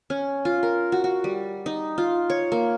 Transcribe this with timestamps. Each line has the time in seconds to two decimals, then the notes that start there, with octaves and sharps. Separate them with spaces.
0.10 C#4
0.45 F4
0.63 A#4
0.92 F#4
1.04 F#4
1.24 G3
1.66 D#4
1.98 F4
2.30 C#5
2.52 A#3